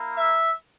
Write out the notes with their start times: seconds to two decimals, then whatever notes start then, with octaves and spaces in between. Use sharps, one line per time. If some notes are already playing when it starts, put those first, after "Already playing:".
Already playing: A#3 E4
0.16 E5